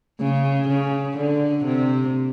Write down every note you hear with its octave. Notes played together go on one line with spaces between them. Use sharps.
C#3
C#3
D3
C3